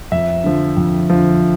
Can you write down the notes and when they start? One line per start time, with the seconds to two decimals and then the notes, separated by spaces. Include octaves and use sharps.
0.12 F2 E5
0.44 D3 F3
0.77 F2
1.10 D3 F3